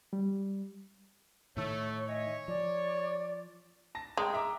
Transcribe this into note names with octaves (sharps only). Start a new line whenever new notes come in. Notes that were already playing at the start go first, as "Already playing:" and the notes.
G3
A2 D#3 A3 C#5 C#6
C#5 D#5 E5 G#5
F3 D5
A5 A#6
G#3 G5 A#5
E5 A#5 D6